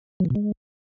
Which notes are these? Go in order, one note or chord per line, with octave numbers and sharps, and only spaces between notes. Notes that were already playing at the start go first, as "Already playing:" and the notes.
F#3
E3
B2
G#3